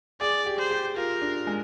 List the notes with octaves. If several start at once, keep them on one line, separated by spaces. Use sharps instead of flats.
G#4 D5
G4
C5
G4
F4 A#4
D4
G#3